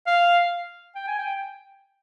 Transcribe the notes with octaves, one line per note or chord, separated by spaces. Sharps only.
F5
G5
G#5
G5